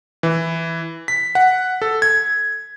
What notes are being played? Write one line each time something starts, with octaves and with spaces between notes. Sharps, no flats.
E3
B6
F#5
A4
G#6